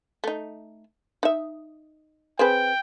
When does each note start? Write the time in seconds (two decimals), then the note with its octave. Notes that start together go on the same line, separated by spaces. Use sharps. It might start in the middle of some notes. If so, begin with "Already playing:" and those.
0.24 A3 D#4
1.23 D#4 E5
2.39 C4 G#4 B4 G5